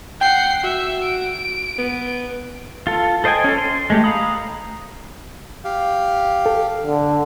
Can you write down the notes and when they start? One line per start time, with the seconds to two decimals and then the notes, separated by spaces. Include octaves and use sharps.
0.21 F#5 G5 C7
0.64 F#4 E5
1.03 D7
1.78 B3
2.87 F4 A4
3.24 A4 C5 D#5 G5 G#5
3.44 C#4 A4
3.58 C6
3.90 G#3 A3 G4
4.04 F5 A#5 B5 D#6
5.64 G4 F5
6.46 A4
6.84 D3